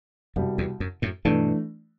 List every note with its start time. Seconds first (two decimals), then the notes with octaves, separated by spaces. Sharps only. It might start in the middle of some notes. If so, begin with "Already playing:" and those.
0.36 C2 F#2 B2 G3
0.58 E2
0.80 F#2
1.02 F#2 A2
1.25 G2 B2 E3 A3 D4